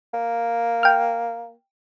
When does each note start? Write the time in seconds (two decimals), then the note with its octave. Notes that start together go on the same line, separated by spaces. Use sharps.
0.14 A#3
0.83 G5 F6